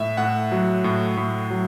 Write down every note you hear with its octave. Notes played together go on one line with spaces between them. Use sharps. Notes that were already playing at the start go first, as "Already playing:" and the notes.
Already playing: A2 E5
A2 F#5
F#3
A2
A2
F#3